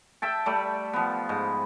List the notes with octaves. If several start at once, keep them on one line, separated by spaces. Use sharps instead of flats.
E5 G5 A5
G3 A3
F3 B3
G#2